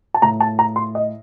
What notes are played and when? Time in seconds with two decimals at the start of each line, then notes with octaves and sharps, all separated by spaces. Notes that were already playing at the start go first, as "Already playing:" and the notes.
0.14 A5
0.22 A2 A#5
0.40 A5
0.59 A#5
0.76 C6
0.95 D#5